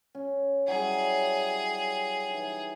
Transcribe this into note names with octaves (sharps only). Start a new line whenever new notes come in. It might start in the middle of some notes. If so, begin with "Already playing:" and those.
C#4
F#3 G3 E4 G#4
E3 D#4